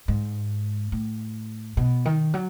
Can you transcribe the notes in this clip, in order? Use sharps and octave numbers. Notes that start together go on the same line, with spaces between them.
G#2
A2
B2
D#3
F#3